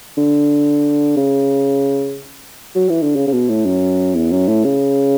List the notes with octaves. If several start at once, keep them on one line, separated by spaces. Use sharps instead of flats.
D3
C#3
F#3
E3
D3
C#3
C#3
B2
A2
F#2
E2
F#2
A2
C#3